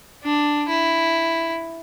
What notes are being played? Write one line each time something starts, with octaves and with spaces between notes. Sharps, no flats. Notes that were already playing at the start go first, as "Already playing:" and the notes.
D4
E4